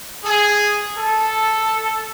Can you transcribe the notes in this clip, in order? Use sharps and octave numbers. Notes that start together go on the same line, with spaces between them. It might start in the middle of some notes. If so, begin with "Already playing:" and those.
G#4
A4